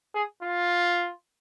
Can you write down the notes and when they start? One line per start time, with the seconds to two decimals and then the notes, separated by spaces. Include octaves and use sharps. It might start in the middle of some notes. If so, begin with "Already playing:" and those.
0.14 G#4
0.43 F4